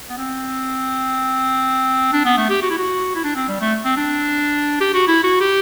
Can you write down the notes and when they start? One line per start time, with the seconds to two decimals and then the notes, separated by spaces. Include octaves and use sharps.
0.10 B3
0.17 C4
2.13 D4
2.25 B3
2.37 A3
2.50 G4
2.62 F#4
2.70 E4
2.78 F#4
3.15 E4
3.24 D4
3.35 C4
3.48 G3
3.61 A3
3.85 C4
3.97 D4
4.80 G4
4.94 F#4
5.07 E4
5.24 F#4
5.40 G4